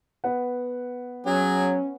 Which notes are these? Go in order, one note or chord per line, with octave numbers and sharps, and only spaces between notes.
B3 B4 F#5
F#3 C#4 G#4